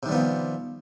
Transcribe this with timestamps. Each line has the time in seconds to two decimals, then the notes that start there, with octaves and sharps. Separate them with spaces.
0.03 C3
0.06 D#3
0.09 G3
0.12 B3
0.14 F3